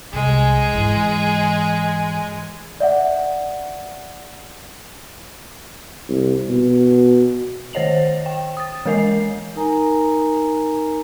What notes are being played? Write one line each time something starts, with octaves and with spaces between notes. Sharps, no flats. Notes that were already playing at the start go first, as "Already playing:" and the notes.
C2 G3 G#3 G#4
G#2 E3
D5 E5 F#5
C2
B2
D#3 C5 C#5 D#5 F7 F#7
G5
D#6 A6
E3 G#3 A#4 D#5 G#5 C7
D#4 A#4 G#5 A#5